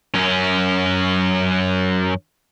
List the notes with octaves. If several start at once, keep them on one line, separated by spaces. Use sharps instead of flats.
F#2 C#4